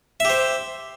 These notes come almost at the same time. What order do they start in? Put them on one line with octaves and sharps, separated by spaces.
E5 G4 C5